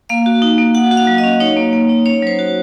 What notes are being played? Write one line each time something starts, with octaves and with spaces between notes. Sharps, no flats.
A#3 F5
F#4
D#4
A#3
F#4 F#5
F#4
F5
F#3
D#5
C#4
D#4 C#5
A#3
A#3
D#4
C#4 C#5
F#3 C5
F#4